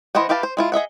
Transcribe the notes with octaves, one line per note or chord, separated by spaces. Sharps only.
E3 E4 C5 D#5 F#5
E4 G4 B4 F5 A5
C5
G#3 E4 F4
G#4 D#5 E5 F#5